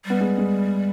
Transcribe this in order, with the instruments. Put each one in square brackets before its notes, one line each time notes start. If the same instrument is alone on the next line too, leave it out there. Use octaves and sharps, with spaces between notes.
[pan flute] G3 [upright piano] B3
[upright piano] G#3
G#3